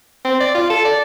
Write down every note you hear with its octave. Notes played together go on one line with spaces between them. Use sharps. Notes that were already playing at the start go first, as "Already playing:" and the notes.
C4
D5
F4
A4
D5